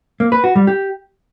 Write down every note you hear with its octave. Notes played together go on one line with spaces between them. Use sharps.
A#3
B4
F#4
G3
G4